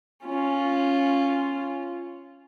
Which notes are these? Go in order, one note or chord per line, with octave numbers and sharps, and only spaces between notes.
C#4 F4